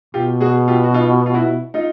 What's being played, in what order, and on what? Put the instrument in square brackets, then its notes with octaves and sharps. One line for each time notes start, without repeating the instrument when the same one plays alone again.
[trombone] B2 [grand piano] F4 G4
[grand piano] F#4 G#4
F4 G4
F#4
D#4 F4
F4
E4 F#4
D#4 F4